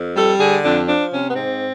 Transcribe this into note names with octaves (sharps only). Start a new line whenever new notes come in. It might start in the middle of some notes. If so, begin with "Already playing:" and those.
Already playing: F2
G3 A4
D3 G#4
F2 D4
F3 D4
C3 C#4
B3
G#2 C4